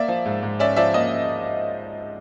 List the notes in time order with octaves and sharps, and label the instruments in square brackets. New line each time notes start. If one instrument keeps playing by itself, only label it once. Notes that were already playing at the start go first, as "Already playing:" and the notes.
Already playing: [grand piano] A#3 D5 E5
F3
G#2
G#2
C#4 D5 E5
F3 D5 E5
A#3 D#5